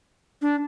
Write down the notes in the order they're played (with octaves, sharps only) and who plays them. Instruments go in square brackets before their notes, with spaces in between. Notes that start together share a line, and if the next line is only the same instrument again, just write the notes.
[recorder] D4